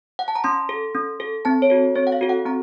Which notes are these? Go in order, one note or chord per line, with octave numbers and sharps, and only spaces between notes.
F#5
A5
A#5
C#4 C6
A4
C#4
A4
C4 A5
C#5
F#4 A4
C4 C#5
F#5
F5
F#4 A4
F#5
C4 A#5